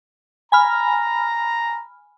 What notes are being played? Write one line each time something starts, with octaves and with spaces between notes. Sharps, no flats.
G#5 A#5 B5 F6